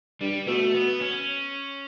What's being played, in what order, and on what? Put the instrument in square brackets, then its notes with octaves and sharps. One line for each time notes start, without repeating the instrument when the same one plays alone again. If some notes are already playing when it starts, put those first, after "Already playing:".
[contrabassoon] G2 [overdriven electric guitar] G3
[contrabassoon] B2 [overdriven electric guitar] A3
[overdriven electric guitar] B3
C#4